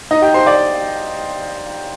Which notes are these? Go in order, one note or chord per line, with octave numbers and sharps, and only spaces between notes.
D#4 D#5
G4 G5
C5 C6
D5 D6